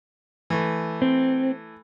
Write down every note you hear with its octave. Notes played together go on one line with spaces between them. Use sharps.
E3 A3
C4